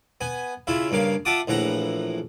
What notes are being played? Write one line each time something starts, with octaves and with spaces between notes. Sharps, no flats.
B3 G#5
C#3 E4 F4 E5
G2 C#3 A#3 F5
F4 E5 F#5 A5 D6 D#6
A#1 A2 E3 F#5 A#5